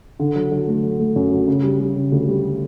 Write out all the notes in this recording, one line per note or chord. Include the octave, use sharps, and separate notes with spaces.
D3
F#3
F#3
A3
F#3
A3
F#2
F#3
C#3
G3
G3
C#3
D2
G3